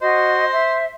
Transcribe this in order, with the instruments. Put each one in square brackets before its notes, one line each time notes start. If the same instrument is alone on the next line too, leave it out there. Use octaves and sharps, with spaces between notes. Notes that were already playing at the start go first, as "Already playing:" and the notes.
[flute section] F#4 D#5 [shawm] C5
[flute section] E5